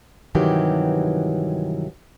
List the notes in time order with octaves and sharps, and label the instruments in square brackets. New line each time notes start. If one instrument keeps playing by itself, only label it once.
[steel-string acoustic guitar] G2 C3 D#3 E3 F#3 G4